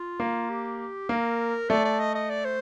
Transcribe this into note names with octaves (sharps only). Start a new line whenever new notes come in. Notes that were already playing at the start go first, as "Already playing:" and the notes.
Already playing: F4
A#3
G4
A#3 A#4
A3 D5
D5
D#5
D#5
D5
C5